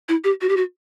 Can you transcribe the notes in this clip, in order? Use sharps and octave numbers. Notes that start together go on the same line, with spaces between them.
E4
G4
F#4
G4
F#4